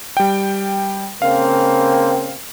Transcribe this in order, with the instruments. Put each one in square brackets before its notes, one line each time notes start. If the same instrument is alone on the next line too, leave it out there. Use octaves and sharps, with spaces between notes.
[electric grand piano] G3 G5
[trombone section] C#3 A#3 C4 [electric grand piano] F5